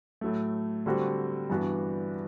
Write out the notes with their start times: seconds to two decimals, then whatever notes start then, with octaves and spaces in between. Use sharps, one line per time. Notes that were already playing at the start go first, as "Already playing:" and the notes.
0.21 A2 F#3 A3
0.86 D3 G3 C4 F#4
1.50 G2 E3 B3 D4 F#4